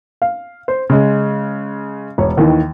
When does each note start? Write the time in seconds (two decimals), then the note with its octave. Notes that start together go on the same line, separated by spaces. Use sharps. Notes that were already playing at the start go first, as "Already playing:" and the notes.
0.22 F5
0.68 C5
0.90 C#3 G#3
2.18 E1 C#5
2.37 D#2 D#3 E3